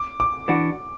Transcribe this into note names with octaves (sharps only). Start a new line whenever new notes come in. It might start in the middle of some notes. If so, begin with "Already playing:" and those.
Already playing: D6
D6
E3 D4 F#4